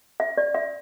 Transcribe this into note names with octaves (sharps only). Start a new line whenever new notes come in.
E5
D5
E5